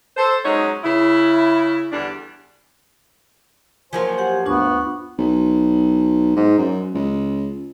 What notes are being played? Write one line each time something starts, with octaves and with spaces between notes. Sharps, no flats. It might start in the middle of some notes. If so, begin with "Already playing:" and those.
A4 C5
F#3 G#3 C#4 D#4 C#5
C#3 E4
E2 D3 G3 D4
F3 F#3 A#3 F4 C5 G#5
G4 F#5
D2 G2 B3 D4 F4 C#6
B1
G#2
F#2
C#2